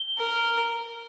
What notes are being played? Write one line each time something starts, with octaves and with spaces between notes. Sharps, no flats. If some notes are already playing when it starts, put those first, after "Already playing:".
Already playing: G7
A#4